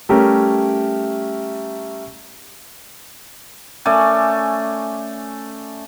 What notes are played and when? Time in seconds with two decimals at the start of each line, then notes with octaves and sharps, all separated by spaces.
0.09 G3 A3 C#4 G4 A#4
3.86 A3 C#4 D5 G#5